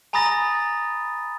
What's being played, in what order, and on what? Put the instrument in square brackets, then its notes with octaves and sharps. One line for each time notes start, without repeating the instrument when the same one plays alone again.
[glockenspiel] G#5 A#5 B5 D#6 A6 A#6